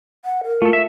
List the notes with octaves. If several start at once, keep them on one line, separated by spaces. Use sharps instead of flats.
F#5
A#4
A3 F4 A4
E5